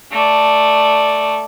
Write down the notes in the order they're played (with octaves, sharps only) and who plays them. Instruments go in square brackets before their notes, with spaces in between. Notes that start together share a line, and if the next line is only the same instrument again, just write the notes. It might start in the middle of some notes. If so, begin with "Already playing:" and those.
[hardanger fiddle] A3 D5